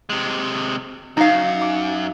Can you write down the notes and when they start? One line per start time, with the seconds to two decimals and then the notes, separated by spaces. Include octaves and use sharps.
0.10 C3 G#3
1.17 F#2 D#4 F5
1.62 D6